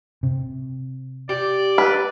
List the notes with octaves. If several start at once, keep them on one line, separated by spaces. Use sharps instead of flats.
C3
G4 D5
B4